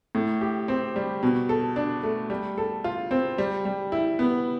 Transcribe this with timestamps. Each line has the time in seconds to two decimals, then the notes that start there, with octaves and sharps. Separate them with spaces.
0.15 A2
0.41 G4
0.68 C4
0.96 G3
1.23 B2
1.49 A4
1.76 D4
2.03 A3
2.30 G3
2.58 A4
2.84 F4
3.11 C4
3.38 G3
3.65 G3
3.92 E4
4.19 B3